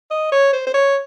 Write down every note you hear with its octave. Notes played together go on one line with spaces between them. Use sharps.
D#5
C#5
C5
C5
C#5